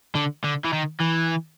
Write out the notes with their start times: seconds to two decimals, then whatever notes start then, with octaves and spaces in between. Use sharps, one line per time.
0.15 D3
0.44 D3
0.64 E3
0.73 D#3
1.00 E3